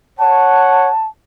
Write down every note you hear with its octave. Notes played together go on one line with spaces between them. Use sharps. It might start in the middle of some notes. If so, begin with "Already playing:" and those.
C#5 F#5 A5